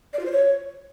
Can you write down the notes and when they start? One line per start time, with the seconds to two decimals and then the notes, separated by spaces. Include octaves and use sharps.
0.13 D5
0.19 F4
0.26 C5
0.32 C#5